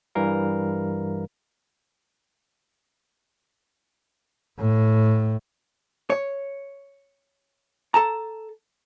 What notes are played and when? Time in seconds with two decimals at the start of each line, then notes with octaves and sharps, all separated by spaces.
0.15 G2 E3 G3 A#4 F5
4.59 A2
6.10 C#5
7.94 A4 A5 A#5